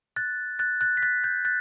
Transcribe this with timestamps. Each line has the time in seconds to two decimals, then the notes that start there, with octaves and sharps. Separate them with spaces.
0.16 F#6 A6
0.59 F#6 A6
0.81 F#6 A6
0.97 B6
1.03 F#6 A6
1.24 G6
1.45 F#6 A6